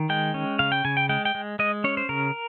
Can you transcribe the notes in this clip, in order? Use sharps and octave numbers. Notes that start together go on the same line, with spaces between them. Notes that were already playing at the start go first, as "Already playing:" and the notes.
Already playing: D#3
G#3 G5
C#4
C#3 F5
G5
C#3 G#5
G5
G#3 G5
G5
G#3
G#3 D#5
C#4 C#5
C5
C#3 A#4